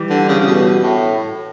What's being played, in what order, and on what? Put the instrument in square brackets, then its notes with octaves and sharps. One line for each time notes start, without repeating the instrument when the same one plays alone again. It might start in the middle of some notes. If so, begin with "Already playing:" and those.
Already playing: [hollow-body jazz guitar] E3 G3
[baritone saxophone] D3
C#3
C#3
B2
A2